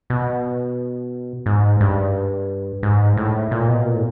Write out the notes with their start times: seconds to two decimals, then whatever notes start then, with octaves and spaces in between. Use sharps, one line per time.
0.10 B2
1.46 G#2
1.81 G2
2.83 G#2
3.17 A2
3.51 A#2
3.68 B2
3.85 A#2
3.94 A2